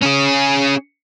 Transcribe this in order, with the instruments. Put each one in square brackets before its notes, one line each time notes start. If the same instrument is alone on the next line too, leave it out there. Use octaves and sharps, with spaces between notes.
[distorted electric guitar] C#4 G#4